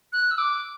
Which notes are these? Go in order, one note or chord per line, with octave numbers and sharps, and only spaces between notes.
F#6
E6
D6